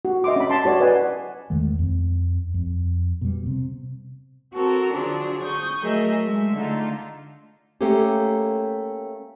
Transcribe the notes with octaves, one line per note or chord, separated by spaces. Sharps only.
F#4
D#5 E5 C6 D6
C#4 B5
A5 C6
F#4 C#5 D5
B4 D#5 F#5 G#5
E2 D#3 G#3 A3
F2
F2
B2 G3
C3
C4 F#4 A4 A#4
D3 F3 F#3 D4 G#4
C#6 D#6 G6
F#3 A3 G#4 A#4 D#5 E5
G#3 A3 E5
D3 A3 D#4 F4
A3 A#3 C#4 G4